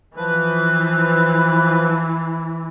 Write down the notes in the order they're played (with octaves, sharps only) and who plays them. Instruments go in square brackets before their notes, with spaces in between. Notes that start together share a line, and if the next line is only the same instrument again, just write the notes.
[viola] E3 [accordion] F3 B4